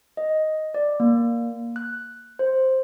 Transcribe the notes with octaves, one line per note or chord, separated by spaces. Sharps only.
D#5
D5
A#3
F#6
C5